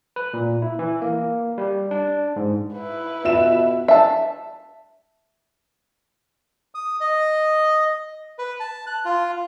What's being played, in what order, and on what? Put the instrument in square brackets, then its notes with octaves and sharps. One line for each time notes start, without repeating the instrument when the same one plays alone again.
[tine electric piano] B4
A#2
E4
E3
A#3
G3
D4
G#2
[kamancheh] E4 B4
[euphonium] B2 [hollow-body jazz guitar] F4 F#4 A4 [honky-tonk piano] E5 E7
[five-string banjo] E5 A5
[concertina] D#6
D#5
B4
A5
F#6
F4